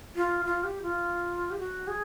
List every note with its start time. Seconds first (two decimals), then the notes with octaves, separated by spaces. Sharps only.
0.16 F4
0.45 F4
0.64 G4
0.82 F4
1.51 G4
1.59 F#4
1.88 G#4